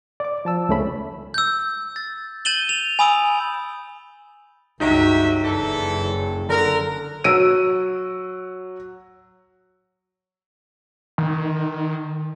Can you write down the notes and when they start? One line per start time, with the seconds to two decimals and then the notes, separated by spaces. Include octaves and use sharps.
0.20 D5 D6
0.45 F3 A5 E6
0.69 C#2 C#3 A3 C#4 B5
1.34 E6 G6
1.96 A6
2.45 G6 A6 D#7 E7 F#7 G7
2.69 F7
2.99 G#5 B5 D#6 E6 D7
4.80 C#2 G2 F#3 D#4 G4 E5
5.43 F#1 F#2 D3 E3 A4
6.49 D3 A#4
7.24 F#3 E6 D7 D#7
11.18 D#3